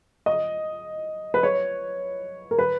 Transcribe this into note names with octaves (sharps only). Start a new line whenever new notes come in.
D#5
B4
C#5
A#4
B4